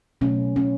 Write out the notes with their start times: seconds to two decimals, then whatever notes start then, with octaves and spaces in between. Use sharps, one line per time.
0.21 B2 F#3 A3 C#4
0.56 C#4